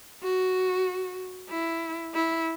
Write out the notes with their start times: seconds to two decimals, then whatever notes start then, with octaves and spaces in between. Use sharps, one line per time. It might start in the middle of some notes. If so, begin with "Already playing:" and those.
0.23 F#4
1.50 E4
2.14 E4